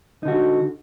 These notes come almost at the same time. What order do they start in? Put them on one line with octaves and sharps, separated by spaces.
D#4 D3 F#4